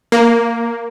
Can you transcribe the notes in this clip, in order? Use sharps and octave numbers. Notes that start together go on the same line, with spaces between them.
A#3